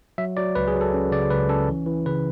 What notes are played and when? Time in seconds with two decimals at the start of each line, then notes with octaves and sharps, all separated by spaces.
0.18 F#3 E5
0.37 F#3 D5
0.55 C#2 B4
0.68 G#4
0.75 F#3
0.81 A4
0.94 C#4
1.12 C#3 D5
1.30 C#2 B4
1.49 C#4 A4
1.69 E3
1.86 E3
2.06 C#3 B4